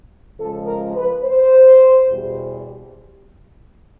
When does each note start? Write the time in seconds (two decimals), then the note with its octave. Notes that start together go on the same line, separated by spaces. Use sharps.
0.39 C#3 F3 G#3 A4
0.67 A#4
0.96 B4
1.24 C5
2.09 E2 B2 G3